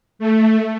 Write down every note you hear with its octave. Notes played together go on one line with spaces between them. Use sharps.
A3